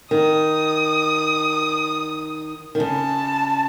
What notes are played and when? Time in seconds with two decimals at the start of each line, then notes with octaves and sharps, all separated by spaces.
0.11 D#3 D#6
2.75 D#3
2.80 C#3 A5